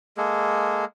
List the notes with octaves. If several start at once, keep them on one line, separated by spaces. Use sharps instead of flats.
G#3 A#3 G#4 A4